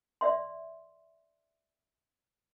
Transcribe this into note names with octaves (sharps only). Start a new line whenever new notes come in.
D5 E5 C6